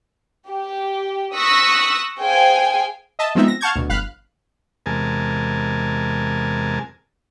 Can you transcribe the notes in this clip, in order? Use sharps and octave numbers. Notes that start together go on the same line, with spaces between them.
G4
C#6 D#6 E6 F#6 A#6 B6
G#4 C5 F5 G5 G#5
D#5 E5 A5
F3 G#3 B3 C4 D#4 E5
A#6
F5 F#5 A5 C#6 G6 G#6
D2 B2
G1 F5 B5 F#6
E2 C3 G#3 A#4 G#5 A5